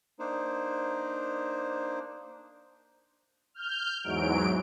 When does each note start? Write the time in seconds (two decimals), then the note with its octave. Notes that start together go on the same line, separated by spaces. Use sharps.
0.19 A#3 D4 D#4 C5
3.54 F6 G6
4.04 E2 G#2 F#3 D7